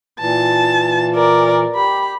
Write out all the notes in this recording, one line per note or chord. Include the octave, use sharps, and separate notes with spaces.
A#2 E3 A5
A#4 D5
G4 B5